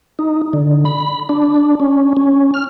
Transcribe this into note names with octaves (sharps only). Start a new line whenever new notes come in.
D#4
D3
B5
D4
C#4
C#4
F6